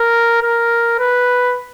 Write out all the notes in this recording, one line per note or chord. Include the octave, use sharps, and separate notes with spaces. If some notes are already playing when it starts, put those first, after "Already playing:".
Already playing: A#4
A#4
B4